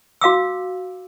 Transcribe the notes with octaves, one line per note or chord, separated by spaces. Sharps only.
F#4 F5 D6 E6